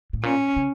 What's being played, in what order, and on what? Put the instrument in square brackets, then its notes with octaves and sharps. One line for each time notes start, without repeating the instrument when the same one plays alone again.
[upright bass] A2
[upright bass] A#2 [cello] C#4
[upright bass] C#3